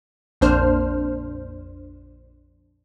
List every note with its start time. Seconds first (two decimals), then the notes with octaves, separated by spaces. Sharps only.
0.41 A#1 F2 A#3 D4 C5 F6